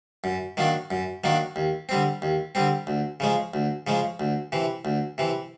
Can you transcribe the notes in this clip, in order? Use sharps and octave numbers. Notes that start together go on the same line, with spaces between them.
F#2
D#3 F#3 A#3 D4
F#2
D#3 F#3 A#3 D4
D#2
D3 G3 C4
D#2
D3 G3 C4
D2
C#3 F3 G#3
D2
C#3 F3 G#3
D2
C3 E3
D2
C3 E3